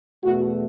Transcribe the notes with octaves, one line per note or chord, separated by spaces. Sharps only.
E2 B2 A3 F#4